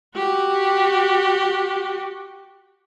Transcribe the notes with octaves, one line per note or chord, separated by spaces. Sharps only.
F#4 G4